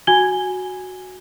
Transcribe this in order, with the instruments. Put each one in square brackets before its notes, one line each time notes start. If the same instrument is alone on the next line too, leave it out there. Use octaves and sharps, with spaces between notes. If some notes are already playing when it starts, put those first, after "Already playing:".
[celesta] F#4 G#5 G#6 G7